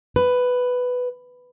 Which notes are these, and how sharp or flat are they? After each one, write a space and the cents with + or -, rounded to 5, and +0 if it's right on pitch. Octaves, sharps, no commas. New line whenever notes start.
B4 +5